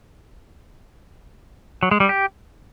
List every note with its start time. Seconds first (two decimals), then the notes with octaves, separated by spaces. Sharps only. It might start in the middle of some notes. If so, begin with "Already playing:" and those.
1.83 F#3
1.91 G#3
2.00 G3
2.09 G4